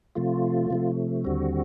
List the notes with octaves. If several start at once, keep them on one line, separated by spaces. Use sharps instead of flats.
C3 F3 A3 F4
C3 F3 A3
D#2 D3 G3 C4 F#4